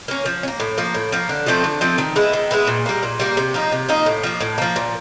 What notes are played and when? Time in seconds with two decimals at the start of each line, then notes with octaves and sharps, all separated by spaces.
0.08 A#3 C#4
0.25 F3
0.43 C#4
0.48 A#3
0.60 A2
0.78 F3 A#3
0.94 A2
1.12 F3 A#3
1.29 D3
1.46 F3 A3 C4
1.64 D3
1.81 F3 A3 C4
1.98 D#3
2.16 G#3 B3 E4
2.33 D#3
2.51 G#3 B3 E4
2.67 A#2
2.86 G3 A#3
3.03 A#2
3.19 G3 A#3
3.37 C3
3.54 F3 A#3 D#4
3.72 C3
3.89 F3 A#3 D#4
4.06 A2
4.23 F3 A#3
4.40 A2
4.58 F3 A#3
4.76 A#2